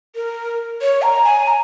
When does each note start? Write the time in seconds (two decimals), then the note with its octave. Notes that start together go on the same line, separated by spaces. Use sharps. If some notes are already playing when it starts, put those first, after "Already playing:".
0.15 A#4
0.81 C#5
1.02 A#5
1.24 G#5
1.46 A#5